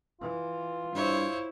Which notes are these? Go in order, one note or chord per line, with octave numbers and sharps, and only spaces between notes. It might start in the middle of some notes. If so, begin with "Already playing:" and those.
E3 F4
G2 E4 C5 C#5